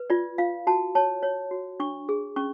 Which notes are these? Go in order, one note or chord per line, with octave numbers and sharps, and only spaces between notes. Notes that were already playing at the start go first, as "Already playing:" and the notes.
Already playing: B4
F4 D5
F4 F5
F#4 A5
C#5 A5
C#5
F#4
D4 C#6
G#4
C#4 C#6